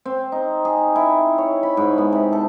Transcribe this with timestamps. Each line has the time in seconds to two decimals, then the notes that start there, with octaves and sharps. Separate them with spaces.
0.05 C4
0.32 D#4
0.65 G#4
0.96 E4
1.38 C#5
1.63 B5
1.77 G#2
1.98 B3
2.12 C3
2.33 A4